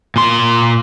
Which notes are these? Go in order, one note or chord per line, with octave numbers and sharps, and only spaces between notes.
A#2 C6